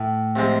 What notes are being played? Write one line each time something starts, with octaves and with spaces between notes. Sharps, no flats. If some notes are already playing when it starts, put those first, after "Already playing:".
Already playing: A2
C3 F3 G#3 C4